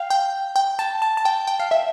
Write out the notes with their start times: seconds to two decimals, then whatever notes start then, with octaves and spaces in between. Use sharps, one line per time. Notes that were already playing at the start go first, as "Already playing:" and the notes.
Already playing: F5 G5
0.10 G5
0.56 G5
0.79 A5
1.02 A5
1.17 A5
1.25 G5
1.47 G5
1.60 F5
1.71 E5